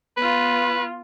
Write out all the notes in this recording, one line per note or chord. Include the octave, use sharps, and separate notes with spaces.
B3 F4 B4